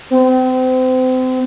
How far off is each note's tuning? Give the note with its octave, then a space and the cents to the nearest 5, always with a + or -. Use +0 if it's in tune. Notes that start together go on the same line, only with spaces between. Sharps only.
C4 -30